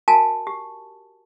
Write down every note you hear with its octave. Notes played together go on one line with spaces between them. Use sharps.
F#4 A#4 G#5 A5
G4